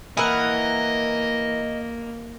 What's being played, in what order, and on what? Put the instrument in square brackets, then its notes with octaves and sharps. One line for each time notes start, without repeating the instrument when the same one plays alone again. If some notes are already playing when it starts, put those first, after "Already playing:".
[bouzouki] E3 A#4 F#5 [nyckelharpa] A#3 [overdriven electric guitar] D#5